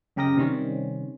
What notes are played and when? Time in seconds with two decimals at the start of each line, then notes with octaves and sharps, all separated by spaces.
0.16 F#2 C#3 G4 A#4 D#5 A#6
0.37 C3 D#3 G3 C4 C#4